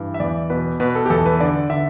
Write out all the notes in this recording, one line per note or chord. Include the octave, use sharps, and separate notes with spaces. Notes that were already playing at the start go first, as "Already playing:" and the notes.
Already playing: G2 E3
E5
E2 D5
B2 B4
B2 B4
A4
G4
E2 A4
B4
D3 D5
D3 E5